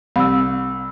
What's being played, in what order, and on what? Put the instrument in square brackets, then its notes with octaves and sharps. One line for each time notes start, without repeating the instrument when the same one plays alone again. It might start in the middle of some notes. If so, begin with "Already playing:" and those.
[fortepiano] C2 [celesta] B5 E6